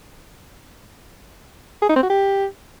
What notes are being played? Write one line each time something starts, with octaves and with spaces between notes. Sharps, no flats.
G#4
D#4
C4
F#4
G4